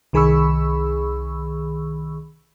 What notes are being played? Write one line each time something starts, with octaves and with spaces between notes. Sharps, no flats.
C2 D#3 G#4 B5 C#6 E6